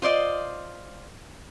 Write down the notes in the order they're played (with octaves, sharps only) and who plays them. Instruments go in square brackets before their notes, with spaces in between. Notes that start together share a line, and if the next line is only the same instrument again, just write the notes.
[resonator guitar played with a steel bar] F4 C5 D5 D#5